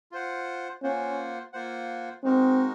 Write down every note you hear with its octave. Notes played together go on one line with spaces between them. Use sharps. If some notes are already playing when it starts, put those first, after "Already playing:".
F4 C5 F#5
A#3 C#4 F4 C5 F#5
A#3 F4 C5 F#5
G#3 C4 D#4 F#4 A#4